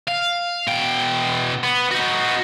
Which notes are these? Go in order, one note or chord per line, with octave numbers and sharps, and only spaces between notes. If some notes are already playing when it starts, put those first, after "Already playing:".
F5
B2 G5
B3
D#4 F#4